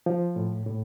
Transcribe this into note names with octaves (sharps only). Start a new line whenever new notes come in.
F3
A2
A2